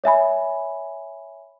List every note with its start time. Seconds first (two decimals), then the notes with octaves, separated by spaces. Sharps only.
0.04 C#5 E5 G#5 B5